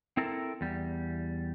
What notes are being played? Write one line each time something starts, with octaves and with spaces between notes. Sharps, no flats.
C4 E4 A4 A#4
E2 G3